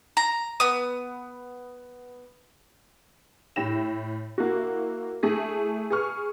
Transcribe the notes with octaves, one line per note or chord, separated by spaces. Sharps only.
A#5
B3 D#6
A2 E4 G5 A#6 E7
A#3 E4 F#4
A3 E4 G#4
G#4 B4 C#6 F6